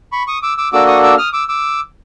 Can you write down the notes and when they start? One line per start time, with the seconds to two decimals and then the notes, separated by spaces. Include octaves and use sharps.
0.12 B5 C#6
0.27 C#6 D#6
0.42 D6 E6
0.58 D6 E6
0.73 A#3 D4 F#4 A4 D6 E6
0.87 C#6 D#6
1.03 D6 E6
1.18 D#6 F6
1.33 D6 E6
1.48 D6 E6